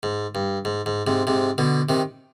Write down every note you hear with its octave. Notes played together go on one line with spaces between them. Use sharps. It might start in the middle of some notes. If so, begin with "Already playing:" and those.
G#2
G2
G#2
G#2
G#2 C3
G#2 C3
B2 D3
C3 D#3